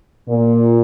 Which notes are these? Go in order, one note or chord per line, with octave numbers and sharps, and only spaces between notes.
A#2